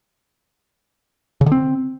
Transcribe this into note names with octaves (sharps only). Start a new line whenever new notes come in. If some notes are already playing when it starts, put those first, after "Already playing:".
C#3
D3
C4